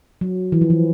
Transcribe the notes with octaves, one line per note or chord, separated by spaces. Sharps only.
F#3
E3
F3
E3